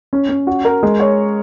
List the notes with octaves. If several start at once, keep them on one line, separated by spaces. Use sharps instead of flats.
C#4
C#4
F#4
A#4
G#3
C#5